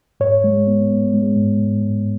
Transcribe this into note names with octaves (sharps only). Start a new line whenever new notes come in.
G#2 C#5
G#3
B3
B3
G#3
G#2
G#2
G#2